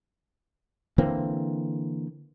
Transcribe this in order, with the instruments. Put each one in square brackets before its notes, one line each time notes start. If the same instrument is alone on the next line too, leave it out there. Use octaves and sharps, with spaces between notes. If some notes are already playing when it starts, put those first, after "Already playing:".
[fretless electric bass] D3 E3 A#3 C4